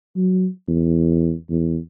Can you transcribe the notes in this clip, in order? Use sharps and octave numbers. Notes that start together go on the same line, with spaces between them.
F#3
E2
E2